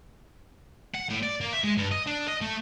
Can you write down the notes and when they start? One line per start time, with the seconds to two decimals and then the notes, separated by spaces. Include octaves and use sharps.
0.95 F#5
1.10 A2
1.23 D5
1.41 A#3
1.53 E5
1.64 G#3
1.77 G2
1.91 D#5
2.07 D4
2.28 D#5
2.41 A3